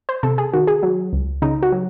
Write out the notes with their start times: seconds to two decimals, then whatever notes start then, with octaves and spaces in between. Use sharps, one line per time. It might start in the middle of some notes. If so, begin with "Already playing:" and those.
0.09 C5
0.23 C3 A4
0.38 G#4
0.53 D#3 F#4
0.67 G#4
0.83 F#3
1.13 C#2
1.42 C#3 D#4
1.62 F#4
1.72 F#3